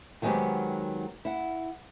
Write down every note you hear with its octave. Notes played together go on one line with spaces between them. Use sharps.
D#3 F#3 G#3 B3 C4 G4
E4 F#5